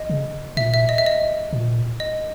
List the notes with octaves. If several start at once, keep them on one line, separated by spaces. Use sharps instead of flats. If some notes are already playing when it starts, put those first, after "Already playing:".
Already playing: D#5
C#3
A#2 E5
E5
D#5
E5
D#5
A#2
D#5